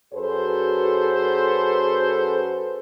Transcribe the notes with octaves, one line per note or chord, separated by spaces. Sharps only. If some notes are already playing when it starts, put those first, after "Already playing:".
F#2 F#4 G#4 A4 B4 C5